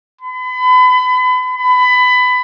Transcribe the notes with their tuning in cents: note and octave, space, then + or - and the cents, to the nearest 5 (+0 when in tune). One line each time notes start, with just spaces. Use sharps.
B5 +35
B5 +20